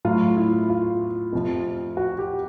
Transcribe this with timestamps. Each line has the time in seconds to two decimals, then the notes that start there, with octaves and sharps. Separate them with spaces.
0.05 A2 F#3 F4
0.37 E4
0.69 F4
1.33 F2 C3 F3
1.97 F#4
2.18 G4